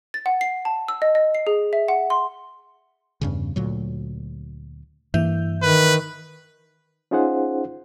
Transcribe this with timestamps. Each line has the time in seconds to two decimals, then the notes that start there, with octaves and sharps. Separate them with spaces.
0.14 A6
0.26 F#5
0.41 C7
0.65 A5
0.88 E6
1.02 D#5
1.15 D#5
1.35 C7
1.47 G#4
1.73 E5
1.88 F#5
2.10 C6
3.21 E2 G2 C#3
3.56 D2 A#2 F#3
5.14 G2 E3 A#3 E5 G6
5.63 D#3 B4
7.11 C#4 D#4 F4 G#4 C5 F#5